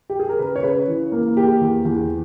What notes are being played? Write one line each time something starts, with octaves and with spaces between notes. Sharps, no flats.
G4
G#4
A#4
C#3 B4
C#5
C#3 B4
E3
A#3 A#4
A#3 G4
E2
E2